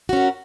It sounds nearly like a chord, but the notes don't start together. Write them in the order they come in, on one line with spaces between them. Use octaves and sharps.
F#4 C#4 A#4